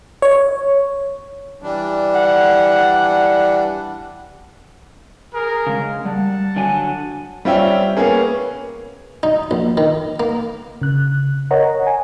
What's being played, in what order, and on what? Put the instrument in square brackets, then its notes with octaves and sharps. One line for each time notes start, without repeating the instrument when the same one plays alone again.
[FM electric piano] C#5
[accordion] E3 G3 D4
[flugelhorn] F#5
[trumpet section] G#4 A#4
[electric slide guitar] C#3 G#3
[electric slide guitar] G3 [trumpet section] F#5 A5
[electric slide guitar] D3 F#3 G#5
[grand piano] G3 C4 C#4 F4 E5 G5
A#3 B3 C#4 G#4
[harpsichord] D#4
A#1
D#3
A#3
[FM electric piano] C#3 F#6
A#4 C#5 D#5 F#5 A#5
G#5